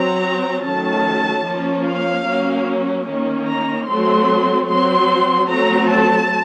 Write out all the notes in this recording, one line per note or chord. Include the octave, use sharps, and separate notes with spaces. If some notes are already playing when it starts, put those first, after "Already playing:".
Already playing: F#3 C4 A#5
D#3 F#3 A3 C#4 A5
F3 A#3 C#4
F5
F#3 A#3 C#4
D#3 A#3 C#4
A#5
F#3 A3 C4 C6
F#3 C4 C6
F#3 A3 C4 A#5
A5